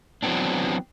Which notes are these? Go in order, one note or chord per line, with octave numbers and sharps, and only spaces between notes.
E3 F#3 G#3 B3 C4 D4